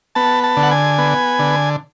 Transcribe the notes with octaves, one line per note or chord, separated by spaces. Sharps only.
B3 A5
A5
D3
F#5
G#5
B3
D3